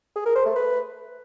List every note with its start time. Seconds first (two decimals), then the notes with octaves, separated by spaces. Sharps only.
0.16 G#4
0.26 A#4
0.36 C5
0.46 A3
0.56 B4